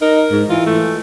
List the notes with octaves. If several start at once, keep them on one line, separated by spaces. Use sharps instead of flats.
D#4 A#4
G#2
E3 F4
A3